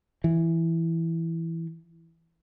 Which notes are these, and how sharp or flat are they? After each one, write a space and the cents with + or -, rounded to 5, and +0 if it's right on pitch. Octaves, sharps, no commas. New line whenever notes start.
E3 +0